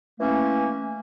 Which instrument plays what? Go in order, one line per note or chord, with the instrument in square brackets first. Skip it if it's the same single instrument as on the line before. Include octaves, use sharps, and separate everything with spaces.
[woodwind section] E3 A3 A#3 C#4